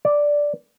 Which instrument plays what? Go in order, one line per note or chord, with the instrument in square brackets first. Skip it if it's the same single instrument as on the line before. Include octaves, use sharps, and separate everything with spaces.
[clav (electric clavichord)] D5